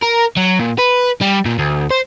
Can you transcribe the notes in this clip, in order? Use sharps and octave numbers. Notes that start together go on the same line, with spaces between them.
A#4
F#3
A#2
B4
G3
A#2
D2
C5